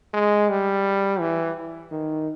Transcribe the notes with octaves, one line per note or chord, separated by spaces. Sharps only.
G#3
G3
E3
D#3